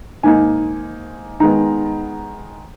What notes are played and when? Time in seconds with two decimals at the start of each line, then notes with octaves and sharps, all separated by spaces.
0.23 G#2 D#3 A#3 D#4 G#5
1.40 D#3 G#3 B3 A#5